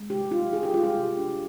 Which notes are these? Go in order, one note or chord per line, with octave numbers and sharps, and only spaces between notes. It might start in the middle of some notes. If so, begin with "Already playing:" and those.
Already playing: G#3
C3 G4
D#4 F4
F3 G#4
G4
G#3 F4
G4
C3
D4